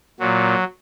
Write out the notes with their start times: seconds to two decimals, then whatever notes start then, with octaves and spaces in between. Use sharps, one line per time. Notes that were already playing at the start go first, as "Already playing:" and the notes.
0.20 A#2 F#3